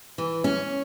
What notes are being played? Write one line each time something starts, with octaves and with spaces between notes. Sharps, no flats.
E3
C#4